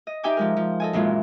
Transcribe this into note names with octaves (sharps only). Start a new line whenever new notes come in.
D#5
D#4 G4 E5 G5 G#5 D6
F3 G#3 A#4
F3
A4 D#5 G#5
F#2 A#2 E3 G#3 F4